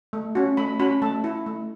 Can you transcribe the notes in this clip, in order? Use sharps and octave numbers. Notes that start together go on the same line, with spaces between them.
A3
C#4 F#4
A3 B5
C#4 F#4 B5
A3 A5
E4
A3